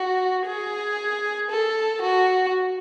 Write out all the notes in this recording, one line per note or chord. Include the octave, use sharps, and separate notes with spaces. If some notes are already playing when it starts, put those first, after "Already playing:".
Already playing: F#4
G#4
A4
F#4